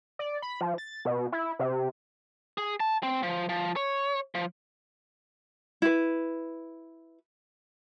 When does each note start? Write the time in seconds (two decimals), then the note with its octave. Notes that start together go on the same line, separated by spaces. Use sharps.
0.19 D5
0.42 B5
0.61 F3
0.78 A6
1.05 B2
1.32 E4
1.59 C3
2.58 G#4
2.80 A5
3.03 C4
3.23 F3
3.49 F3
3.76 C#5
4.35 F3
5.82 E4 B4